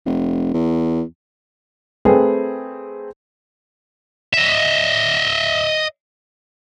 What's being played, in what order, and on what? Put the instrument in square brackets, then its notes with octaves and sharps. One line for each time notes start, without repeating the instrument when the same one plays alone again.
[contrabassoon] F1
E2
[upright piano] A3 C4 G#4 B4
[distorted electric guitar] D#5 E5